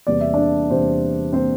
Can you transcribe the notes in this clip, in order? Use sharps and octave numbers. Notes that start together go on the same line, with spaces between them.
E2 C3 G3 A#3 D5
E5
D4 D5
E2 C3 G3 A#3 C4 C5
C3 G3 A#3 C4 C5